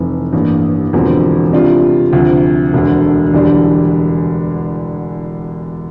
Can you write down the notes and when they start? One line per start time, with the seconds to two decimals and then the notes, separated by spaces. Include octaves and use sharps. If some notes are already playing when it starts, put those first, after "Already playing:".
Already playing: F1 F2 E3
0.33 A1 G2 E3 A#3
0.93 E1 E2 D3 F3 C4
1.53 C3 G3 D4 F4
2.13 D2 C3 F3
2.73 E1 D2 D3
3.33 E1 E2 D3 G3 D4